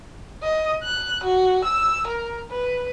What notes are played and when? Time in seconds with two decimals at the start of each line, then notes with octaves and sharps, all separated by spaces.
0.43 D#5
0.84 F#6
1.24 F#4
1.65 E6
2.07 A#4
2.50 B4